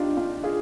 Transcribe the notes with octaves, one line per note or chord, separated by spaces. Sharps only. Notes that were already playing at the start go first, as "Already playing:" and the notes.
Already playing: D4 D#4 F4 G4
D4 F4
F4 G#4